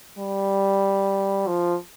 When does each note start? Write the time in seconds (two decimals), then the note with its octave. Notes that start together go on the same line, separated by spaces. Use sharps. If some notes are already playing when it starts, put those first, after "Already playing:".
0.18 G3
1.47 F3